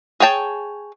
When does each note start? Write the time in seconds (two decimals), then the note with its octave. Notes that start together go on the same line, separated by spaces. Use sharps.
0.20 G#4 C#5 G5 A5